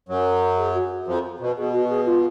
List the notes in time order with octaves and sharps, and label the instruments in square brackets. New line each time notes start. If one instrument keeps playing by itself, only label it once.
[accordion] F#2 F#3
[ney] G#4
F#4
[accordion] F2 F3
B2
[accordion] B2 [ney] G#4
[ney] F#4
G#4
F4